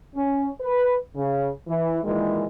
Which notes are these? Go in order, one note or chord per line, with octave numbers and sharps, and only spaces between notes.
C#4
B4
C#3
E3
A#2 D#3 E3 G#3